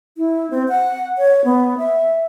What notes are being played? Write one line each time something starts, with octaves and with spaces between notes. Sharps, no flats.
E4
C4
F#5
C#5
B3
E5